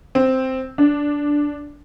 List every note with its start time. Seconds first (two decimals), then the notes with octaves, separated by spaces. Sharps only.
0.15 C4
0.78 D4